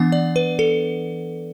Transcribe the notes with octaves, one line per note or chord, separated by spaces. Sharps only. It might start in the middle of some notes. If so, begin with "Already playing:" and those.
Already playing: E3 B3 D4 F#5
D5
B4
A4